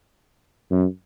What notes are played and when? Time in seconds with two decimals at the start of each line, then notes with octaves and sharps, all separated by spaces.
0.71 F#2